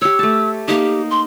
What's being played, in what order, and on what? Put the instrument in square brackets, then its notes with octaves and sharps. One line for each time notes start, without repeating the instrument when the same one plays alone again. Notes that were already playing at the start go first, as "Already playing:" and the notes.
[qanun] G4 C#5 [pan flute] E6
[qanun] A3 A5
[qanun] A#3 D#4 [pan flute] G4
[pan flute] C6